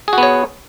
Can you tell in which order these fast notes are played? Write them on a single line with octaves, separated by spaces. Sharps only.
G#4 F#4 B3 C#5